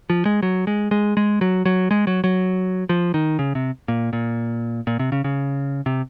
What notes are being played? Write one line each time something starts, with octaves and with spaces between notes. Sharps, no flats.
F3
G#3
F#3
G#3
G#3
G#3
F#3
F#3
G#3
F#3
F#3
F3
D#3
C#3
C3
A#2
A#2
A#2
C3
C#3
C#3
C3